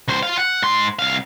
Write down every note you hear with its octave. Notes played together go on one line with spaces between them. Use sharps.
C#2 C5
F4 F5
F#5
G#2 C6
C2 F5